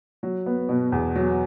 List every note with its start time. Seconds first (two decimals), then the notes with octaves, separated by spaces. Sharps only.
0.23 F#3
0.46 B3
0.69 B2
0.92 E2
1.15 F#3